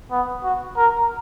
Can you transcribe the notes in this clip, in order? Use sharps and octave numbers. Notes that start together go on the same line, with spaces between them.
B3
F#4
A#4